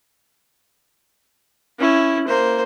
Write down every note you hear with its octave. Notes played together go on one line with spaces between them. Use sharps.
C#4 E4
A#3 C5